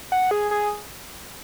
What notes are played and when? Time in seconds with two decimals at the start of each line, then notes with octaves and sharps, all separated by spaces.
0.12 F#5
0.31 G#4
0.51 G#4